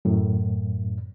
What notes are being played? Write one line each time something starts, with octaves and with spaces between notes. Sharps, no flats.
F#2 A2